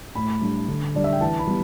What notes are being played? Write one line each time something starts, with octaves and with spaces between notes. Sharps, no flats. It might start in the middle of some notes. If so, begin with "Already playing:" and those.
A2 B5
G3 D4
D3
G3 D4 D5
E5
G5
E3 A5
B5
G3 B3